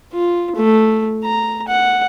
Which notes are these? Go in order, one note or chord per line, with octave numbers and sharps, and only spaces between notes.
F4
A3
A#5
F#5